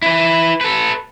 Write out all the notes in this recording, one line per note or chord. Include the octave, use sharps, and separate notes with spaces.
E4 B4
A4 B4